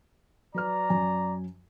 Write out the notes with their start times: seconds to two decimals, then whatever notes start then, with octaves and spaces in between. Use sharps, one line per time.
0.54 F#3 B4 D5 A#5 F6
0.89 F#2 F#3 G#5